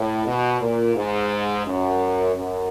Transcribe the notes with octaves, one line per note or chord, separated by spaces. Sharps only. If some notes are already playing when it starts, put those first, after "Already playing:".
Already playing: A2
B2
A#2
G#2
F#2
F#2